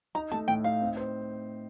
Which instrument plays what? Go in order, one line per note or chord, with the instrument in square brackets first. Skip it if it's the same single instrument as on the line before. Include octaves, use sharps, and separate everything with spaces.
[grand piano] D#4 [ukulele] A#5
[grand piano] A3 [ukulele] A5
[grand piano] A2 [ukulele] G5
[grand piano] D#4 [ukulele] F5
[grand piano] C4
C5